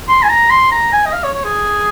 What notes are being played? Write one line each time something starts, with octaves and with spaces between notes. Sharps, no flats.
C6
G#5
A#5
C6
A#5
G#5
D#5
F5
C#5
C#5
G#4